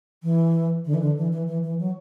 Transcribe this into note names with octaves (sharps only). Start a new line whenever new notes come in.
E3
D3
E3
D3
E3
E3
E3
E3
F#3